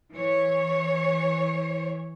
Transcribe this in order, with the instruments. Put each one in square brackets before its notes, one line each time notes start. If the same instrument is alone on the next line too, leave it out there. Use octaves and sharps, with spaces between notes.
[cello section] E3 C#5